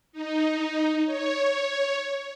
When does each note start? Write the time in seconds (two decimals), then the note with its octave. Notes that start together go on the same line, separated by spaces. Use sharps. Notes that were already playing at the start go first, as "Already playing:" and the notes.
0.12 D#4
1.06 C#5